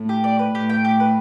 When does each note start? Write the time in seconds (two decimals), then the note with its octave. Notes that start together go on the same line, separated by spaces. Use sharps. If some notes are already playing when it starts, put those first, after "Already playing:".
Already playing: A2
0.09 G4
0.24 D5
0.39 B4
0.55 A2 G4
0.70 G5
0.85 G4
1.00 B4